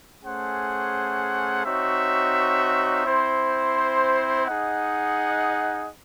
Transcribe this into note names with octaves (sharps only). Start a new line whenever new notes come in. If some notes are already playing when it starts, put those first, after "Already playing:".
A3 C#4 G#4 C5 F#5
C4 D#4 F#4 C#5 E5
C4 E4 C5
D#4 G#4 D#5 F#5